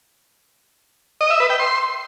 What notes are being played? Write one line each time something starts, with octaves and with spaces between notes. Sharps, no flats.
D#5
E5
B4
G5
C6